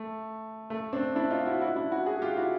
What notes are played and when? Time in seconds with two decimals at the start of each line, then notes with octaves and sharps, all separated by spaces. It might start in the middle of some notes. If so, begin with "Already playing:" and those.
Already playing: A3
0.70 A3
0.93 C4 D4
1.15 D4 E4
1.30 D#4 F4
1.46 E4 F#4
1.61 E4 F#4
1.76 D4 E4
1.91 E4 F#4
2.06 F#4 G#4
2.22 F4 G4
2.37 E4 F#4